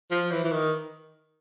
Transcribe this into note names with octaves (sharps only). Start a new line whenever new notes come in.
F3
E3
E3
D#3